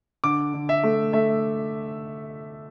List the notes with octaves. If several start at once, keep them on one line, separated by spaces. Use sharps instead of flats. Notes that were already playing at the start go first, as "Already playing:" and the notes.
D3 D6
D3
E5
A3
A3 E5